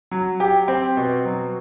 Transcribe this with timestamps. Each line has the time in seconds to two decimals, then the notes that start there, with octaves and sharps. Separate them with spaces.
0.11 F#3
0.40 G4
0.68 C4
0.97 B2
1.25 F#3